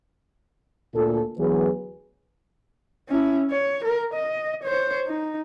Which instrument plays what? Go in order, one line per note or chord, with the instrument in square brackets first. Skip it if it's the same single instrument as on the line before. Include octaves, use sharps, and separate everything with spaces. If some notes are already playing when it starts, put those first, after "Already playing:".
[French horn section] D2 A#2 F4 A4
D2 E3 F#3 B3 G#4 B4
[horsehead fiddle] C#4 E4
C#5
A#4
D#5
C5 C#5
D#4